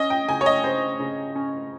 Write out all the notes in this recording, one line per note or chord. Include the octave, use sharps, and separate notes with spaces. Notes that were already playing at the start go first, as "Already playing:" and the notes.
Already playing: C#4 D#5
G5
C#3 G#5
C#5
D#5
C#3 C5
C#3
C#4